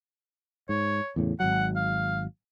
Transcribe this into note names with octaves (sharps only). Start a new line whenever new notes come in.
G#2 C#5
E2 A2 C#3
G#1 D#2 F#3 F#5
F5